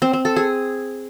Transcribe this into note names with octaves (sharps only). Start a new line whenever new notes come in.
C4
C4
A4
G#4